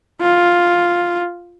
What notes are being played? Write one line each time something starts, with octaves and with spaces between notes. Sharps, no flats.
F4